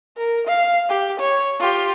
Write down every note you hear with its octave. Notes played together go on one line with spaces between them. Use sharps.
A#4
F5
G4
C#5
F4 G4